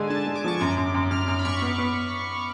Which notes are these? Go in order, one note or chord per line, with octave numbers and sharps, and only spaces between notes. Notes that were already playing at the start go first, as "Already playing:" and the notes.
Already playing: D3 G#3 D4 G#5
D4 A5
G#3
D6
F3 C#6
F#2 D6
F#2
F#2
F#2 F6
F#2 F6
B5
F#2 C#6
B3
B3